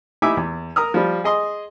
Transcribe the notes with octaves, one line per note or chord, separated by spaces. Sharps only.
D#4 E4 G4 E5 G#5 D6
E2
A#4 A#5 D#6 F6
F3 G3
G#4 D#5 C6